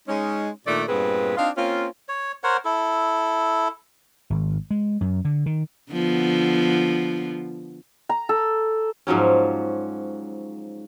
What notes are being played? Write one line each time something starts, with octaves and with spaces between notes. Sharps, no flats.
G#3 C#4 D#4
A#2 D#3 A3 D4 D5
G2 A#2 B3 C4 G#4 B4
C4 D4 D#4 F4 F5
A#3 C4 C#4 F4
C#5
A#4 C5 C#5 F#5
E4 A4
G#1
G#3
F#2
D3
D#3
D3 F3 B3
A#5
A4
G#2 F3 F#3 C#4